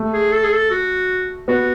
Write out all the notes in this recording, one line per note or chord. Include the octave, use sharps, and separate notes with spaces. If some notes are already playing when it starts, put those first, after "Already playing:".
Already playing: A3
G#4
A4
G#4
A4
F#4
B3 F#4